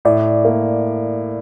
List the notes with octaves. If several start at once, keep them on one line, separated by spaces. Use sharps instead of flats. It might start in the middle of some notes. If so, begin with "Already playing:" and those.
A2 D5
A#3